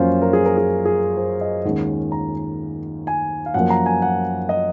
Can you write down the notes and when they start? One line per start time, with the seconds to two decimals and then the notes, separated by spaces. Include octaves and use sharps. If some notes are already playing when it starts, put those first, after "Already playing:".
Already playing: F#2 F3 A#3 C#4 F4 C5
0.22 A#4
0.33 G#4
0.45 A#4
0.58 G#4
0.85 G#4
1.17 C5
1.41 D#5
1.65 D#2 D#3 G#3 C#4 F#5
2.12 A#5
3.07 G#5
3.46 F5
3.54 F#2 F3 A#3 F#5
3.70 A#5
3.86 G#5
4.02 F#5
4.49 D#5